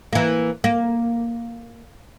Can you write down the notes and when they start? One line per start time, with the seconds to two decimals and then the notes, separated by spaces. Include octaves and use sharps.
0.13 E3 A#3
0.64 A#3